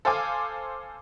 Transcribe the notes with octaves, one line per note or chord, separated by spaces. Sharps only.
A4 C5 F5 G#5 D6